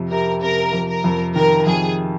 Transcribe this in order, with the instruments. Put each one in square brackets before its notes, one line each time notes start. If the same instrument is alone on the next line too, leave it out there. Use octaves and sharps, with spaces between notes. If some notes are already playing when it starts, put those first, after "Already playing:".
Already playing: [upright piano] F2 C3
[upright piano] C3 [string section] A#4
[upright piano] C3 [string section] A#4
[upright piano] F2
[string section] A#4
[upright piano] F2
[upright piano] D#3 [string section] A#4
[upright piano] F2 [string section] G#4